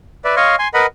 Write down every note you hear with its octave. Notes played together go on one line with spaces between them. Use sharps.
B4 D5 E5
C#5 D#5 F5 C6 C#6
G#5 C6
A#4 B4 D#5 F#5 B5